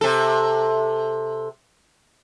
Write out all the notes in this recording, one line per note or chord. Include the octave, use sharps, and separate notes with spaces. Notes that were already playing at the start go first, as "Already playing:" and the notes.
C3 A4